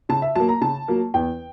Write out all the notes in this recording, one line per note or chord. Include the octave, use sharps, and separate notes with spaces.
C#3 A5
E5
F#3 A#3 A5
A#5
C#3 A5
F#3 A#3
E2 G5